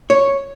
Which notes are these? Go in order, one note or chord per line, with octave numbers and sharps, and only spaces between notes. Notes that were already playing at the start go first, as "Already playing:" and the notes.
C#5